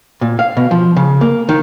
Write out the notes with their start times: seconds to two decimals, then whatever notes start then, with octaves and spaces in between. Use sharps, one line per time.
0.21 A#2
0.39 F5
0.57 B2
0.71 F3
0.97 C#3
1.21 A#3
1.49 D#3